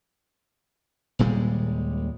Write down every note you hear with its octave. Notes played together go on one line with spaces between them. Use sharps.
D#1 A#2 G3 G#3